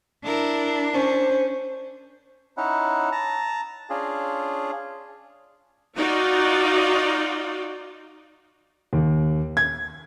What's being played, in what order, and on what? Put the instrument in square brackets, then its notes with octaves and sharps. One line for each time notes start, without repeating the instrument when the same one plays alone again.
[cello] D4 [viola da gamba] E4 A#4
[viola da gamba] C#4 [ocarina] C5
[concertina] C#4 D#4 E4 F#5
A5 A#5
C#4 D4 F4 G#4
[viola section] D#4 F4 F#4 D5
[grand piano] D#2
G#6